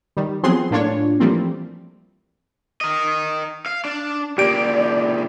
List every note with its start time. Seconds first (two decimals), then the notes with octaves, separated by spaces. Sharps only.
0.17 D#3 G3
0.43 F3 F#3 B3 C4 G#4 C6
0.71 A2 A#3 D4 F4 C#5
1.20 E3 F3 G3 A3 A#3 C4
2.81 A#4 D#5
3.66 F5
3.85 D4
4.38 C#2 A#3 G4 D5 G6 D7